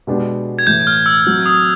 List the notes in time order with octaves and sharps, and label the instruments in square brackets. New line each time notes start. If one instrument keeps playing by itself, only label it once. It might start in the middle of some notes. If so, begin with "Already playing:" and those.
[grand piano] B2 G#3 B3 D4 G4
[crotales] G#6
[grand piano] A2 E3 A3 [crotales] G6
[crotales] F6
E6
[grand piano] F#3 A3 C4
[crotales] D#6